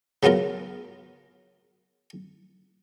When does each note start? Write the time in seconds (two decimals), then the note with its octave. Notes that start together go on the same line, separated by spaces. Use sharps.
0.23 C#3 F#3 B3 F4 A#4